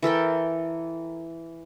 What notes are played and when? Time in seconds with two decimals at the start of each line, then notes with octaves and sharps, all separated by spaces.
0.02 E3 A4 A#4 G5